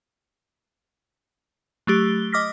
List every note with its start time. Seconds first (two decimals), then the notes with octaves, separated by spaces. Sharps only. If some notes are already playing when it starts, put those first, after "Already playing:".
1.87 F#3 A3 G4 G7
2.32 D#5 D6 D#6 F6 A#6 B6